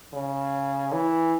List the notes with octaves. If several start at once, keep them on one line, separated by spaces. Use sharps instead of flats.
C#3
E3